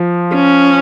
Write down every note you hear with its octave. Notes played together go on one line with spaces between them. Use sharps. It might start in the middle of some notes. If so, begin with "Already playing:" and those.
Already playing: F3
C#4